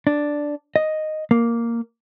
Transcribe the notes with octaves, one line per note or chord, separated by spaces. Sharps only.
D4
D#5
A#3